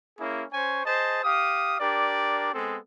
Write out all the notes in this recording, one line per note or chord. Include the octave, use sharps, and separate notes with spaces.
A#3 C#4 E4 G#4
C#4 C5 G#5 C#6
G#4 C5 D#5 A5
G4 F5 D#6
D4 G4 A#4 D5
G#3 B3 C4 A4